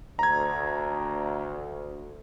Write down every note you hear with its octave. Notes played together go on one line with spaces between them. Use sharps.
D2 A#5 G#6